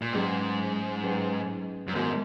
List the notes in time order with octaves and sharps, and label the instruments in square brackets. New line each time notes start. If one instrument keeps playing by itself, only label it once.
[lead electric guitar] A#2
[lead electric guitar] G#2 [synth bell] F#3 C#4 G#4 B4
[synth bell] F#3 C#4 G#4 B4
[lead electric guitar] F#2
[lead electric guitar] G#2 [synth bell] D#3 G#3 B3 F#4 A#4